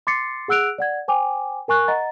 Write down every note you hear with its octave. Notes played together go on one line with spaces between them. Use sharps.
C6 D6 A6 C7 C#7
G#4 F#5 E6 F#6 D7 F7
D5 F#5 G#6
C5 G5 G#5 D6
A#4 G#5 C#6 F#6
D#5 F#5 A#5 A6